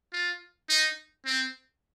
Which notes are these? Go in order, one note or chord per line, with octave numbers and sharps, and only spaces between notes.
F4
D#4
C4